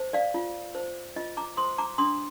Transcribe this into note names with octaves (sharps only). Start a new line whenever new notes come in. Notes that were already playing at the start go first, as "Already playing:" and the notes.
Already playing: C5
D5 F5
F4
C5
F4 D#5
A#5 D6
C5 C6 D#6
A#5 D6
D4 C6 D#6